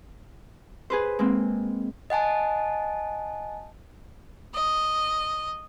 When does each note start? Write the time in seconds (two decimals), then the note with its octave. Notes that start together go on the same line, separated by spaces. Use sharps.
0.90 G#4 B4 C5
1.19 G#3 A#3 C4
2.10 D#5 F#5 G#5 A5
4.55 D#5